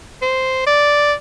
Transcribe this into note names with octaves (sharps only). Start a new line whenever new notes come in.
C5
D5